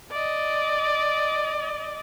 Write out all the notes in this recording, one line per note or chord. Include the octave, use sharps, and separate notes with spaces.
D5 D#5